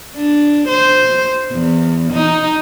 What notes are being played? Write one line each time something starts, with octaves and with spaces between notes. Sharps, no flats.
D4
C5
E2
D#4